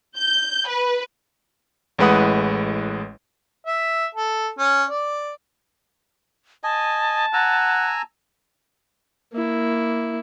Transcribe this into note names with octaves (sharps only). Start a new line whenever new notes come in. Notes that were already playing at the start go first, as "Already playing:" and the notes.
G6
B4
A1 A2 G#3 B4 F#5 D#6
E5
A4
C#4
D5
D#5 G#5 A5
F#5 G#5 A#5 E6
A#3 E4